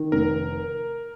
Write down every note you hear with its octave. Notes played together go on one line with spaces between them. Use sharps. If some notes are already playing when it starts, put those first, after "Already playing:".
Already playing: D#3
F1 A#4